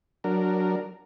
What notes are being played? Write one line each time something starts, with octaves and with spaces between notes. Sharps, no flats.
F#3 D4 A#4